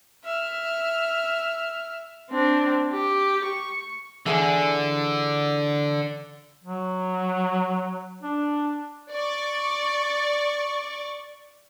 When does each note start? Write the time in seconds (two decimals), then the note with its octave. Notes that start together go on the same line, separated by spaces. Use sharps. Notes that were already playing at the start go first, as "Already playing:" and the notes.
0.24 E5 F6
2.31 C4 D4
2.92 G4
3.45 C#6
4.26 D3 E3 G#4 G#5
6.64 F#3
8.23 D4
9.12 D5 C#6